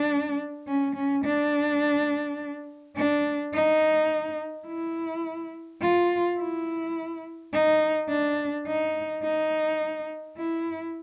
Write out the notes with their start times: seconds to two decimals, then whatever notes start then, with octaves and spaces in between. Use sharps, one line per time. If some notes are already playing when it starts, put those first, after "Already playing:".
Already playing: D4
0.68 C#4
0.95 C#4
1.24 D4
2.96 D4
3.53 D#4
4.67 E4
5.81 F4
6.38 E4
7.52 D#4
8.09 D4
8.66 D#4
9.23 D#4
10.37 E4